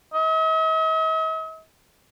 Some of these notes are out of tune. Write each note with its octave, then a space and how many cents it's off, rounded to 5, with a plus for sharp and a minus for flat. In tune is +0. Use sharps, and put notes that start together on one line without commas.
D#5 +45